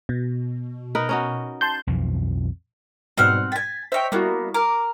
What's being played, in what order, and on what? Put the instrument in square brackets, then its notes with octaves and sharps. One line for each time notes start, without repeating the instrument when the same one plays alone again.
[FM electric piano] B2
[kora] D#4 A#4 B4
C#4 D#4 F#4
[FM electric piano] A5 C6 G6
[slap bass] B1 F2 E3 F3
[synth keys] G#2 B2 G3 [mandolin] C4 F#5 F6
[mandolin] G5 G#5 [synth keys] A6 B6
[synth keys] C5 D#5 G5 [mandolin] C#5 E5
[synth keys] G3 E4 F#4 [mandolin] A#3 B3
[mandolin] A#4 [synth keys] D6